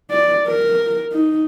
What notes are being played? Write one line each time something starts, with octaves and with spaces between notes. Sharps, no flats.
D5
A#4
D#4